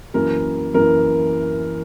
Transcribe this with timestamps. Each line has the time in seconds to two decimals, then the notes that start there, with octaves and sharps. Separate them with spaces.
0.14 F#2 E3 A#3 A#4
0.74 F#2 E3 A#3 A#4